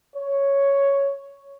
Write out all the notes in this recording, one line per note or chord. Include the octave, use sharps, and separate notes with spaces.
C#5